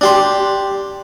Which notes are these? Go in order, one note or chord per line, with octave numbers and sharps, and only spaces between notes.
D4 G4 C6